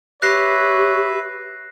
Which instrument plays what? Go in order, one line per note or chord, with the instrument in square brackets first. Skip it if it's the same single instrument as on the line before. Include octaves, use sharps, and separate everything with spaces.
[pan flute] G4 [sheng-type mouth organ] B4 E5 [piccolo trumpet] C#5 [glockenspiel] F#6 A#6 C7